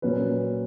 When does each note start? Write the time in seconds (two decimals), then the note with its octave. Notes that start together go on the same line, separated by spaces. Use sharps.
0.02 A#2 F#3 A#3 C#4 B4